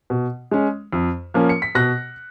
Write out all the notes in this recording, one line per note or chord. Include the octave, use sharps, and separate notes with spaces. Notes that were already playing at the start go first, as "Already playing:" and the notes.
B2
G#3 C#4
F2
F3 A#3 C#4
C#7
B6
B2 F#6 A#6